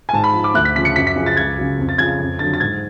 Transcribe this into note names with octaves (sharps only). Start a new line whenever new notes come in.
G#5
G#2 A5
B5
F3
D6
D2 F#6
B6
C#3 F3 B6
C#7
F#2 B6
B6
C#3 F3
A6
C#2 G#6
C#3 F#3
F2
A6
C#3 F3 G#6
F2
D3 F#3 A6
A6
G#2 G#6